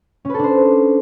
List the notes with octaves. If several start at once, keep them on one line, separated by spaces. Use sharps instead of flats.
C#4 D4 A4 B4 C5